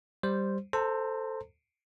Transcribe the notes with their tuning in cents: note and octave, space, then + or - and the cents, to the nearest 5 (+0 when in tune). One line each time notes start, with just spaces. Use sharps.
G3 +0 C5 +0
A4 +5 C5 +0 A#5 -35